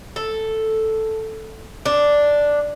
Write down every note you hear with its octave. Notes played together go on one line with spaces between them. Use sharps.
A4
D4